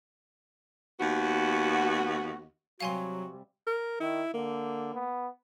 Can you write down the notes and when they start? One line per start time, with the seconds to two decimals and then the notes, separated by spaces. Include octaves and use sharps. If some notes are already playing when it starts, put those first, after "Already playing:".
1.00 D#2 B3 F#4
2.81 C3 F#3 G3 F#4 F5 G#5 C6
3.67 A#4
4.00 D#3 E4
4.34 D3 A#3
4.94 B3